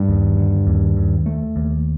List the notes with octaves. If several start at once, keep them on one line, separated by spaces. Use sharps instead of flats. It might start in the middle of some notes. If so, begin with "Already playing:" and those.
Already playing: G2
D#2
D3
D#2
D#2
A3
D#2